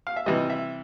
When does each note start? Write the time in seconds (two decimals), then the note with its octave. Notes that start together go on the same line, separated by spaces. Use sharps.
0.07 F5
0.16 E5
0.26 C3 E3 G3 D#5
0.50 E5